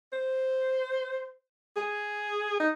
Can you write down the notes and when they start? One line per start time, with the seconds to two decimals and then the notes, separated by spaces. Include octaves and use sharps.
0.13 C5
1.76 G#4
2.60 D#4